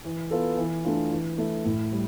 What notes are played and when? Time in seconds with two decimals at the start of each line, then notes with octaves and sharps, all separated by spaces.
0.05 E3
0.31 B3 F4 A4
0.57 E3
0.84 A3 D4 F4
1.11 E3
1.38 A3 E4
1.65 A2
1.92 G3